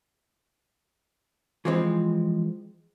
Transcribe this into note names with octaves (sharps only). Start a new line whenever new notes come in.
E3 F3 G#3 C4